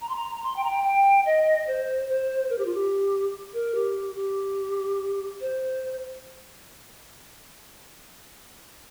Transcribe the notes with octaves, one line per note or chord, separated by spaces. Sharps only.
A#5
C6
A#5
A#5
C6
G5
A#5
G5
G5
D#5
C5
C5
A#4
G4
F4
G4
A#4
G4
G4
C5